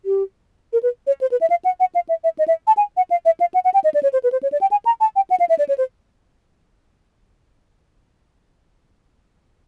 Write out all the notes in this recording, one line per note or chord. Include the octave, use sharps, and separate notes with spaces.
G4
A#4
B4
C#5
C5
B4
E5
F5
F#5
F#5
F5
E5
E5
D#5
E5
A5
G#5
F#5
F5
E5
F5
F#5
F#5
G5
D#5
D5
C#5
C5
B4
C5
C#5
D5
G5
G#5
A#5
A5
G5
F#5
F5
E5
D5
C#5
C5